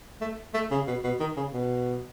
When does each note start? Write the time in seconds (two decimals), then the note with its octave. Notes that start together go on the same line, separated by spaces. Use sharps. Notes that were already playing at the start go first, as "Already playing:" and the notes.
0.21 A3
0.54 A3
0.71 C#3
0.87 B2
1.04 B2
1.20 D#3
1.37 C#3
1.53 B2